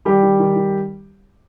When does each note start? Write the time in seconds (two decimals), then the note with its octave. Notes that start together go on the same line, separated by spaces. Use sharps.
0.05 D#3 G3 G4
0.22 D#3
0.39 D#3
0.55 D#3